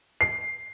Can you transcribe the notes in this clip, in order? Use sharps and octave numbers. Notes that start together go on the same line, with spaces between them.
C7